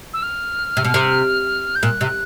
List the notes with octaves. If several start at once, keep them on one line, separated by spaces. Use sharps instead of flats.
E6
F6
C3
B2
C3
G6
A#2 F#6
C3